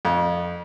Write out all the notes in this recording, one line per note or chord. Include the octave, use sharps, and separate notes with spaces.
F2